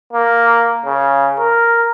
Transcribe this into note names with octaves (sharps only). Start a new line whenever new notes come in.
A#3
C#3
A#4